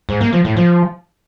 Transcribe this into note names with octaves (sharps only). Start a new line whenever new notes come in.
G#2
A#3
F3
A2
F3